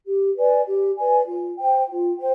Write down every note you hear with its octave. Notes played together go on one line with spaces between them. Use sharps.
G4
B4 D5 G#5
G4
B4 D5 G#5
F4
C5 G5
F4
C5 G5